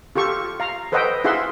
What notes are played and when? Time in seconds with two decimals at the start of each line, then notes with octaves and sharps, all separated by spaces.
0.16 F4 G4 A4 C#6
0.60 F5 A#5
0.92 A4 B4 C5 D#5 F#5 G5
1.24 E4 F4 G#4 E5 F#5 C6